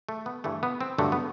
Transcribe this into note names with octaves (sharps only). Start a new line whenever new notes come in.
A3
B3
G2 E3 A3
B3
C4
G2 D3 F#3 A3
B3